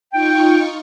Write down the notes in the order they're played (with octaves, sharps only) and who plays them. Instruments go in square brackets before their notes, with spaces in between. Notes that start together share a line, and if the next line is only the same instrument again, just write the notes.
[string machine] D#4 F4 C#6 [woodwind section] G5